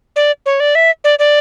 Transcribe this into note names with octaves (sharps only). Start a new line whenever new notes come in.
D5
C#5
D5
E5
D5
D5